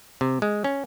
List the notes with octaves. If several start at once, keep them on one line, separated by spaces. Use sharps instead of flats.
C3
G#3
C#4